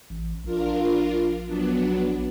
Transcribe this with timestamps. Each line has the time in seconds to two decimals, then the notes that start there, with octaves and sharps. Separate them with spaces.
0.10 A1
0.44 A#1 D4 F4 A#4
1.47 F#3 B3 D4